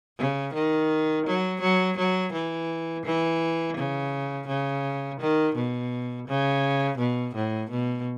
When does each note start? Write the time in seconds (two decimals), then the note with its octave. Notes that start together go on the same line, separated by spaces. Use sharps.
0.18 C#3
0.54 D#3
1.26 F#3
1.61 F#3
1.97 F#3
2.33 E3
3.05 E3
3.77 C#3
4.48 C#3
5.20 D#3
5.55 B2
6.28 C#3
6.99 B2
7.35 A2
7.71 B2